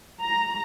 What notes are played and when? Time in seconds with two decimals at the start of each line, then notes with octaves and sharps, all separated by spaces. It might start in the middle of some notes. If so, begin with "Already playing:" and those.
0.22 A#5